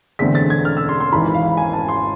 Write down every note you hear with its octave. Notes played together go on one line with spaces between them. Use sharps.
E1 E2 D3 A3 C4 B6
A6
G#6
F6
E6
C6
C6
G#1 G#2 E3 B5
F5
F5
G#5
A5
C6